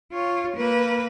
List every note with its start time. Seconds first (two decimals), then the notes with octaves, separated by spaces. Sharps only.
0.13 F4 C#5
0.56 A#3 B4